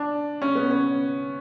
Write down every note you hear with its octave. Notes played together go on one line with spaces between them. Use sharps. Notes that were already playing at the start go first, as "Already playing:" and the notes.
Already playing: D4
C#4
B3
C#4